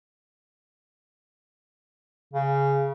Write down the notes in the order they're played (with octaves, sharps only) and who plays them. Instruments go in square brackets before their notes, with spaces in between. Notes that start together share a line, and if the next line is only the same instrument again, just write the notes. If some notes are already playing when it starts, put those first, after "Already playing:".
[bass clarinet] C#3